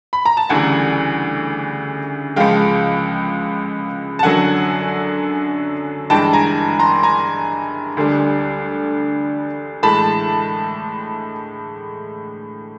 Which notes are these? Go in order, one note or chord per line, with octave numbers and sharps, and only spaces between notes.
B5
A#5
A5
D2 C#3 E3 G3 F#5 G#5
C#2 C#3 F3 G#3 F5 G5
A5
F#2 D3 F#3 F#5 G#5
G2 E3 G#3 G5 A5
G#5 A#5
A#5 C6
G#5 A#5
D2 D3 G3
A2 E3 G#3 A5 B5